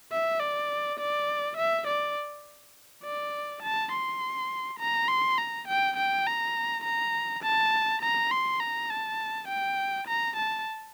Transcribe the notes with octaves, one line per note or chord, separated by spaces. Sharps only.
E5
D5
D5
E5
D5
D5
A5
C6
A#5
C6
A#5
G5
G5
A#5
A#5
A5
A#5
C6
A#5
A5
G5
A#5
A5